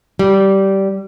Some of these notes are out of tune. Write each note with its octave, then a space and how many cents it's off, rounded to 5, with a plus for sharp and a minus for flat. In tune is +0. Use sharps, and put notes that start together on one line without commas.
G3 -15